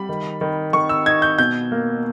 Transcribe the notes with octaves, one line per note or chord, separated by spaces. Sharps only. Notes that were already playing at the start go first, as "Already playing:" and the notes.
Already playing: G3 B5
D#3
D#3
D#3 C#6
E6
D#4 G#6
G6
B2 G6
A#3